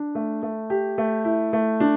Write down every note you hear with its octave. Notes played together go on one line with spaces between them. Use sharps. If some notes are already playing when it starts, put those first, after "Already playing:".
Already playing: D4
A3
A3
G4
A3
E4
A3
D4